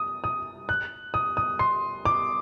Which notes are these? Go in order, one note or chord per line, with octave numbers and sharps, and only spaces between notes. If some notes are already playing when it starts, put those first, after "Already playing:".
Already playing: D#6
D#6
F#6
D#6
D#6
C6
D6